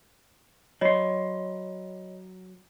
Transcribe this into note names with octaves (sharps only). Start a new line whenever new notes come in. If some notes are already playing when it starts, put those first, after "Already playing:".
F#3 C#5 D#5 B5 C6